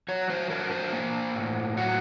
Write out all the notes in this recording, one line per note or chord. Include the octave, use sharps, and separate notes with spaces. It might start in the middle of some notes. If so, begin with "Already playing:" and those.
F#3 C#5
C5
D4 A#4
C5
A#3
A2
F#3 F#4